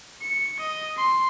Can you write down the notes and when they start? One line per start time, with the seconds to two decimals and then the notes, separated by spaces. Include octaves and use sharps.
0.22 C#7
0.59 D#5
0.97 C6